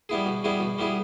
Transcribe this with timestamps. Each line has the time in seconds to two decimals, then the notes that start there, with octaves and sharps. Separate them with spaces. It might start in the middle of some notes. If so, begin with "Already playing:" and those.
0.09 G3 B3 E4 G#4
0.26 B2
0.44 G3 B3 E4 G#4
0.60 B2
0.78 G3 B3 E4 G#4